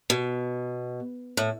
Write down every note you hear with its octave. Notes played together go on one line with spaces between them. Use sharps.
B2
A2